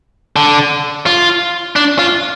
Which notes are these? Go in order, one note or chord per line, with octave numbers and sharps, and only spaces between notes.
D3
F4
D4
F4